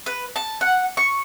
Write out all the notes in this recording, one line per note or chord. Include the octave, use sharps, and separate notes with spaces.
B4
A5
F#5
C#6